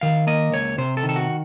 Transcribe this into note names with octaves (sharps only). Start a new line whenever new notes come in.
D#3 F5
A#3 D#5
C#2 C#5
C3 C5
A4
D#3
A4
F#4